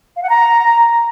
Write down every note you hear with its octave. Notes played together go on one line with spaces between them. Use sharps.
F5
F#5
A#5